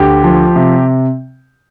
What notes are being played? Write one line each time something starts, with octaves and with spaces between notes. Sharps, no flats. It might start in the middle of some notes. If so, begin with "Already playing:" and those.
Already playing: D2 G4
F3
C3